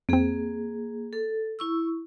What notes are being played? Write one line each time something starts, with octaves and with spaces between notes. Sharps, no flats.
F2 A#3 C4 G#4
A4
E4 C#6 E6